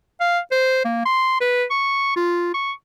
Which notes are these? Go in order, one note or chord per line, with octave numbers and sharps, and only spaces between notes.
F5
C5
A#3
C6
B4
C#6
F4
C#6